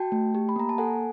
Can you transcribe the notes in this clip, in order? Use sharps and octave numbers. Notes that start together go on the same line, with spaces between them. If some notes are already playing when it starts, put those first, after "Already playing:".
Already playing: F#4 G5 A5
A3
G4
B5
A#3 A#5
A5
A4 F#5 G#5